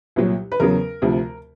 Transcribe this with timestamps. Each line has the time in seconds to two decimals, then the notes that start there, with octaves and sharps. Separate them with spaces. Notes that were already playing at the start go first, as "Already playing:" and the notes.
0.16 C2 A#2 F#3
0.52 B4
0.60 E2 C#3 F#3 A#4
1.02 D2 C3 F3